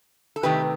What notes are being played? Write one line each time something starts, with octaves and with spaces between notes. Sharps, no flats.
A4
C3 D#3 A3 G4 B4